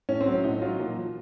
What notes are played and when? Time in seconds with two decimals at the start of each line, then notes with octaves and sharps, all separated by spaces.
0.09 A2 C#4
0.21 C4
0.26 F#3
0.32 C#4
0.44 A2 D#4
0.62 F#3 F4
0.79 A#2
0.97 F3